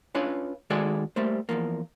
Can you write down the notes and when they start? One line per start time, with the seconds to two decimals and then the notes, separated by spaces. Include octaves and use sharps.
0.15 C#4 D4 F4 B4 C#5 F5
0.70 D#3 G#3 F#4 G#4 A4 D5
1.16 G3 A3 A#3 C5
1.49 E2 G2 F3 A#3